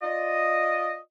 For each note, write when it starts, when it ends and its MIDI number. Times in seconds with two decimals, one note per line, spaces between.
0.02 0.98 65
0.02 0.98 74
0.02 0.98 75